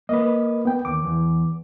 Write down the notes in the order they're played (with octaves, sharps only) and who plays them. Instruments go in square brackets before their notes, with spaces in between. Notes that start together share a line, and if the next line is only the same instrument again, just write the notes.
[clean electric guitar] A#3 B4 [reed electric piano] D#5
[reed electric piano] B3 G5
[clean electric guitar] D#2 [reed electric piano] D6
[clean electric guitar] E2